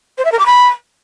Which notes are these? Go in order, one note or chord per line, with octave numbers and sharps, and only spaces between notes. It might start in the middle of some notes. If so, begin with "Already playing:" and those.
C5
E5
A#4
D6
B5